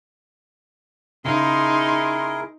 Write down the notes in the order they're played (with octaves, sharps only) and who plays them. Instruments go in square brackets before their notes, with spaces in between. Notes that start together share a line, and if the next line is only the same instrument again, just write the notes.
[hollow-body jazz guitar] C#3 [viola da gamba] D#4 [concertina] E4 G#4 A#4 [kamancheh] C6